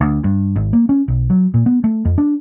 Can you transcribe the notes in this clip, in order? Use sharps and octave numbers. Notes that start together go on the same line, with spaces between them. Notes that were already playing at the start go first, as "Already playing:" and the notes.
D2
G2
G#1
A#3
C#4
B1
F#3
A#2
B3
A3
F2
D4